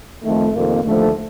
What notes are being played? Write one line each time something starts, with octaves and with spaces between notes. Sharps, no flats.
F2 D#3 A3
F2 C3 D#3 A#3
D#2 D3 F3 A3